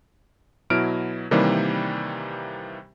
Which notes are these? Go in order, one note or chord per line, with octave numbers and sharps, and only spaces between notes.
B2 F#3 E4 F6 D7
C3 D#3 E3 G3 A#3